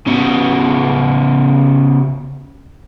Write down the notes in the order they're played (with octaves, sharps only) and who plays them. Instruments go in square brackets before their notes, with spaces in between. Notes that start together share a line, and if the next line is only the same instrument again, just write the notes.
[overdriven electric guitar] C#3 B3